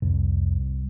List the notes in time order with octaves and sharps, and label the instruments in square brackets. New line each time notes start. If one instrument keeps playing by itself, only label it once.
[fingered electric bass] C2 [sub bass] F2